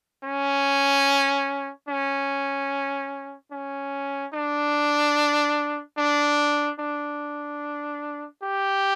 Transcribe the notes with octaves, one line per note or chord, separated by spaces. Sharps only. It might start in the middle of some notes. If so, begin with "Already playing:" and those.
C#4
C#4
C#4
D4
D4
D4
G4